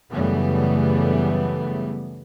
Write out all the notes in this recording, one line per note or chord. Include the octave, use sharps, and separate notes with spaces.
F#2 C#3 E3 G3 A3 B3